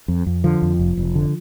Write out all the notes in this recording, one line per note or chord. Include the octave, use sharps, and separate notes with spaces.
F2
F2
D3 F3
F2
F1
F1
D3